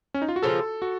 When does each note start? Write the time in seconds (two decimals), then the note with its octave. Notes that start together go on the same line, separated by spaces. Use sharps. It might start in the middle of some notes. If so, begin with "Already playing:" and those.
0.14 C#4
0.22 D#4
0.28 F4
0.36 F#4
0.42 C#3 F3 A#3 F4 A4
0.82 F#4